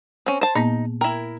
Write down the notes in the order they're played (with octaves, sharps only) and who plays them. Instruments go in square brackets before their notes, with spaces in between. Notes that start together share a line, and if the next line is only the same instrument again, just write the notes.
[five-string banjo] C4 C#4
C5 A5
[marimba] A#2 A#3 B3 [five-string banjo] D#4
[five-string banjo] E4 A#4 [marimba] G5